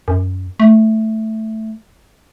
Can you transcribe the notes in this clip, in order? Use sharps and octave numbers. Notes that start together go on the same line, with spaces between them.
F#2
A3